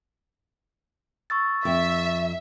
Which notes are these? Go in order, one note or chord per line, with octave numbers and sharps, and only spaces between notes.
C#6 E6 A6
F2 E5